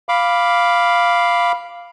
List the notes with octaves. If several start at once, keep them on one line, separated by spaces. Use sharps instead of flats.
F5 B5 D6